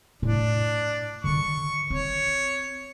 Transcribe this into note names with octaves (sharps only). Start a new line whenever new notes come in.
A2 D4 E4
D3 D#3 C#6
C4 C#5